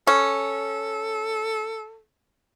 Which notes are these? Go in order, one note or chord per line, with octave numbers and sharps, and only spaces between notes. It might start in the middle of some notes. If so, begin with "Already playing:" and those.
C#4 A4